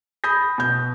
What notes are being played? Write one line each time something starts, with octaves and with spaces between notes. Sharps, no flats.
B5 D#6 G6 A#6
B2 G6